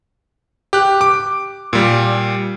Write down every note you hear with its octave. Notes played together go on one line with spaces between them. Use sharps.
G4 F#6
D6
A#2 G3